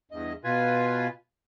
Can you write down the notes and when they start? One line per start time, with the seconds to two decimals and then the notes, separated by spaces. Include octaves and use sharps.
0.11 E2 G2 D#5
0.44 B2 F4 B4 G#5